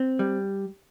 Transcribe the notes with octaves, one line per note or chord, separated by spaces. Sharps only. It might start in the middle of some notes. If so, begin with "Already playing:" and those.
Already playing: C4
G3